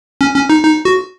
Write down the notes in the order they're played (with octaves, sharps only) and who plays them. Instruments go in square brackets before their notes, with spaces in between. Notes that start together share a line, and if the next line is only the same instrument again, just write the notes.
[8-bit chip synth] C#4
C#4
D#4
D#4
F#4